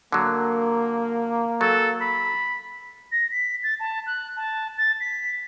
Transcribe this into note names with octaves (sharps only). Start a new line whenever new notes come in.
D3 F#3 A#3
F#3 A4
B5
A#6
B6
A6
A5
F#6
A5
A6
B6